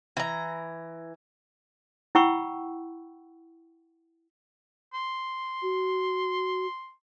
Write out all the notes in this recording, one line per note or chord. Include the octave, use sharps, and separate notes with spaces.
E3 A#5
E4 F#5 G5 B5 C#6 E6
C6
F#4